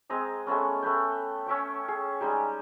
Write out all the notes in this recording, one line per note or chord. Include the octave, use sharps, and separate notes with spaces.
G#3 C4 A#5 D#6
G#3 A3 B3 C#4
A3 B4 G5
C#4 E5 G5 C#6
G#4
G3 G#3 D#4 G4